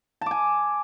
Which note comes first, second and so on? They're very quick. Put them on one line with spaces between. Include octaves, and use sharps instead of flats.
A5 D6 G#5